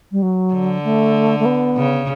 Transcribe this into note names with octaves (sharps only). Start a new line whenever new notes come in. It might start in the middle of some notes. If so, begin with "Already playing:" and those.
G3
F#3
D3
A3
A3
B3
C#3